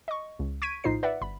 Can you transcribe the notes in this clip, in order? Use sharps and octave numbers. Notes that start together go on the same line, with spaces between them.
D#5 C#6
C#2
C#6 G#6 B6 D7 D#7
A#1 A2 D#4 F4 C5 C7
B4 D5 E5 F#5
G1 B5